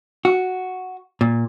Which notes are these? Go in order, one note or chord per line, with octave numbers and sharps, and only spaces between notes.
F#4
A#2